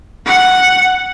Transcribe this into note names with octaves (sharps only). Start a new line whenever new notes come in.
F#5